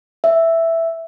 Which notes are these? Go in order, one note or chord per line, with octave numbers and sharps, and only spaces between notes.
E5